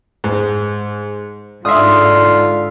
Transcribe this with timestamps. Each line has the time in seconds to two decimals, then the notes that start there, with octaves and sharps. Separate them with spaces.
0.24 G#2
1.65 G#2 D3 F4 E5 D#6